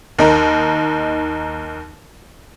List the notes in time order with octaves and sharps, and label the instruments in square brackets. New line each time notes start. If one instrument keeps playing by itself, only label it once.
[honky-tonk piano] D#2 D#4 A#4